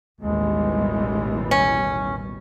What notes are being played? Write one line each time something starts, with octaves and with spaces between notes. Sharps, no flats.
A1 D#2 B2 E3 G3 G#3
C#4